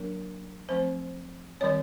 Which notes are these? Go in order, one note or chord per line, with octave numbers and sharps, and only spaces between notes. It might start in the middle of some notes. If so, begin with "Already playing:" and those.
Already playing: F#3 A#3 D4 A#4
F3 A3 C4 C5
D#3 G3 C4 C#5